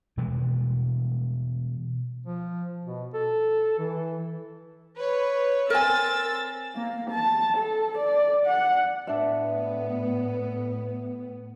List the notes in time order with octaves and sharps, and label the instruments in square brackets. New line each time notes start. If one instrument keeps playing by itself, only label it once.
[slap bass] B2 E3 G3 G#3
[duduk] F3
B2
A4
E3
[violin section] B4 C#5
[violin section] C4 E6 A6 [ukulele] A#4 G#5
[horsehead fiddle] A#3
A5
A4
D5
F#5
[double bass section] A2 [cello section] B3 [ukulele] D4 E5